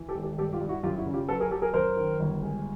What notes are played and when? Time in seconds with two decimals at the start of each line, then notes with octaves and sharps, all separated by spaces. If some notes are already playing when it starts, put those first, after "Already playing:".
Already playing: E3
0.09 G4 A4
0.15 G#1
0.23 G4 A4
0.38 G2 G4 A4
0.53 F4 G4
0.61 G2
0.69 E4 F#4
0.83 F#2 F4 G4
0.98 E4 F#4
1.06 C#3
1.14 F4 G4
1.29 F#3 A4 B4
1.40 G#4 A#4
1.51 F#3 G4 A4
1.62 G#4 A#4
1.73 F#2 A#4 C5
1.97 D#3
2.20 G1
2.42 G#3